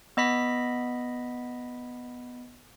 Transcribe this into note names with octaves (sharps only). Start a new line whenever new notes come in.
B3 D#5 B5 B6